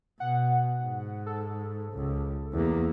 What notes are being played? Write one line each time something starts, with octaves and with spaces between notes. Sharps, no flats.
B2 F#5
G#2
A4
C#2
E2 A#3